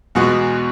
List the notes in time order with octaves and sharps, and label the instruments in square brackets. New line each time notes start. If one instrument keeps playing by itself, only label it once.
[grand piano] E2 B2 G#3 B3 F#4